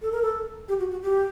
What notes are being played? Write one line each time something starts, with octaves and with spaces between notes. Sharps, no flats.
A4
A#4
A4
G4
F#4
F#4
G4